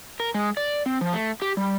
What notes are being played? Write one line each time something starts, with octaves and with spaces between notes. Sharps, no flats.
A#4
G#3
D5
C4
F3
A3
G4
G3